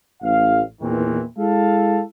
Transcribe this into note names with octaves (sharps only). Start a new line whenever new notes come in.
A1 F5
E2 A#2 D#3 E3 C4
G#3 E4 A4 F5